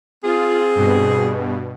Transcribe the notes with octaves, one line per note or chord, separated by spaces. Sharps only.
C4 F4 G#4
G2 B2